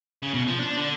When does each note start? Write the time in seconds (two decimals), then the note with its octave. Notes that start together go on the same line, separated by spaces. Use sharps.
0.22 C#3
0.34 B2
0.47 F3
0.59 D4
0.77 D3